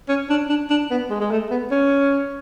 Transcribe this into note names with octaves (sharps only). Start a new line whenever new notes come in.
C#4
D4
D4
D4
B3
G#3
G#3
A3
B3
C#4